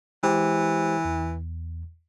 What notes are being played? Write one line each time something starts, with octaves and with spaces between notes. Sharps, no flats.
E3 G#3 G4 C5
E2